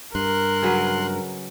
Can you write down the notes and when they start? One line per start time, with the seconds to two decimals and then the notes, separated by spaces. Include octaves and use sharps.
0.15 G2 A#4 C6 F#6
0.62 C#3 F#3 B4